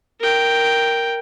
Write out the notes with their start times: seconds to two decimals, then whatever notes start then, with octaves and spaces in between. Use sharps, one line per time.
0.20 A#4 G5